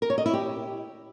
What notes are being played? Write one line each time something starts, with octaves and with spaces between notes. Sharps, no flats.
A#4
C#5
D#5
E4
G4